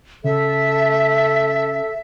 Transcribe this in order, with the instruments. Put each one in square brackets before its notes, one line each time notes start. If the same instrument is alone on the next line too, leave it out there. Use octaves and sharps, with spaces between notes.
[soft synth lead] C#3 [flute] A4 [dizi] E5